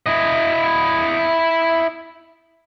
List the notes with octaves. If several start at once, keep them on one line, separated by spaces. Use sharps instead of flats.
E4 D#5